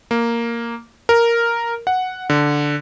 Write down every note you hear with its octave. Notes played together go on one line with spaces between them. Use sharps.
A#3
A#4
F#5
D3